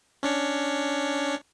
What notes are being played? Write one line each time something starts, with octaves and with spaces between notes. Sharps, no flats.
C#4 D4 C#5